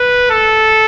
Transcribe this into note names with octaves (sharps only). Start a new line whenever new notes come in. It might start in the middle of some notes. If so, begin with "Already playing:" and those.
Already playing: B4
A4